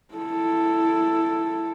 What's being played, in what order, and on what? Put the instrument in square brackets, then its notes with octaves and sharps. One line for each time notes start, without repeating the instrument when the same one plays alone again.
[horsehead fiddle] E4 A4